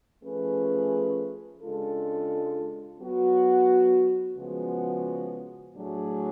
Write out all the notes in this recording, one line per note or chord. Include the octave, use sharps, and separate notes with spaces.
F3 A3 C#4 G#4 B4
C#3 G#3 D4 F4 A4
F#3 B3 F#4
C#3 F3 G#3 B3 F#4
A2 F#3 A3 D4 G#4